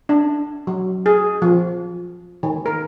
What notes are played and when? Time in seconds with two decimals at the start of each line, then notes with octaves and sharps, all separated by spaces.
0.09 D4
0.67 F#3
1.06 G#4
1.42 F3
2.43 D#3
2.66 A#4